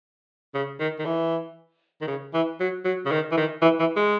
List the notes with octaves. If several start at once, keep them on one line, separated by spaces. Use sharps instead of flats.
C#3
D#3
D#3
E3
D#3
C#3
E3
F#3
F#3
C#3
D#3
E3
D#3
E3
E3
G#3